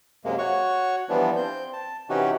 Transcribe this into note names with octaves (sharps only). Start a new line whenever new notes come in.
F#2 C3 G#3 A#3
F#4 C#5 C#6
E3 F3 G3 B3 D4
C4 G6
A5
C3 E3 C#4 D#4 F#4 G4